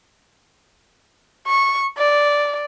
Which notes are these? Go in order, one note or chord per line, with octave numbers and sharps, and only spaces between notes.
C#6
D5